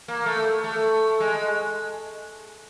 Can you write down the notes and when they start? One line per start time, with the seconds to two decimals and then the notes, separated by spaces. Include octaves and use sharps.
0.08 A#3
0.26 A3
0.64 A3
1.20 G#3